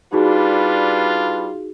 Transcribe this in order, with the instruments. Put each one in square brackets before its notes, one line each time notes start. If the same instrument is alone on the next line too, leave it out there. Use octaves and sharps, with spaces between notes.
[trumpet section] G3 D4 B4 [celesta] D#4 F#4 G#4 [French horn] F4